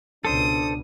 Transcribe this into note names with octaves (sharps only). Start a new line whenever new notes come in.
C#2 B2 D4 A4 C5 D#6